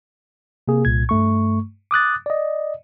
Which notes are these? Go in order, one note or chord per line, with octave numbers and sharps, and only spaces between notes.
C3 A#3 G#4
C2 A#2 G#6
G2 A3 C#6
D6 D#6 F#6 A6
D5 D#5